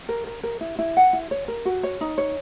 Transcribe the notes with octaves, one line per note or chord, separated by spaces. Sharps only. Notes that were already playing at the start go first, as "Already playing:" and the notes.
A#4
A#4
A#4
E4
E4
F#5
E4
C#5
A#4
F#4
C#5
D#4
C#5